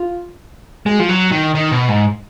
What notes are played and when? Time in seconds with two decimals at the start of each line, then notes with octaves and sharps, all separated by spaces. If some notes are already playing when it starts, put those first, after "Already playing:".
Already playing: F4
0.86 G#3 F#4
1.00 F3
1.09 F#3
1.32 D#3
1.55 D#3
1.72 B2
1.89 G#2